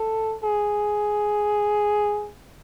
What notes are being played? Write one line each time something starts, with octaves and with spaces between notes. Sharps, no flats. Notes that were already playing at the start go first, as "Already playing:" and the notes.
Already playing: A4
G#4